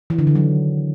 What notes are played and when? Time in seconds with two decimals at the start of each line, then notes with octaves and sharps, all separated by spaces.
0.10 E3
0.19 D3
0.27 D#3
0.35 F#3